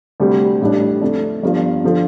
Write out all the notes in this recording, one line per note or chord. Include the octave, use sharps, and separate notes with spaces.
D2 C3 G3
A1 A2 G3 D4
F2 D3 A3 D4
G1 G2 F3
D3 F3